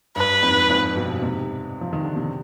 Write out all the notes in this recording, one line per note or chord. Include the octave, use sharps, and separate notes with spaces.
G2 B4
F2 G#2
F2 G#2
G2 B2
G#2 C3
F3
D#3
D3
C3